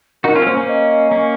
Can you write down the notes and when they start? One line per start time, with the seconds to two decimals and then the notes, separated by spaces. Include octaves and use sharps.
0.24 D#4 F#4 A#4
0.35 C#4 F4
0.42 C4
0.46 A#3 C#4 C5
0.57 A#3 C#4
0.68 D#5
1.11 A#3 C#4